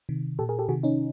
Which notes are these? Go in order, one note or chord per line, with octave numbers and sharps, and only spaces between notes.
C3 D#3
A#2 G4 A4
G#4 A#4
G4 A4
C3 D#3 F#4 G#4
C#4 D#4